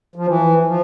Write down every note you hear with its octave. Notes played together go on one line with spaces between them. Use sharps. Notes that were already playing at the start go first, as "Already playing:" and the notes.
F3
E3
F3